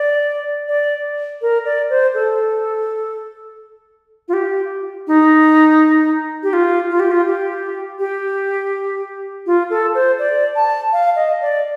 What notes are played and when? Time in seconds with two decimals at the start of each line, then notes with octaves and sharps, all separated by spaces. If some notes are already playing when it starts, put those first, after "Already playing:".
Already playing: D5
0.68 D5
1.42 A#4
1.65 D5
1.90 C5
2.14 A4
4.28 F4
4.33 G4
5.07 D#4
6.43 G4
6.53 F4
6.90 F4
7.00 G4
7.11 F4
7.27 G4
7.99 G4
9.46 F4
9.70 A4
9.95 C5
10.19 D5
10.56 A5
10.93 F5
11.16 D#5
11.41 D5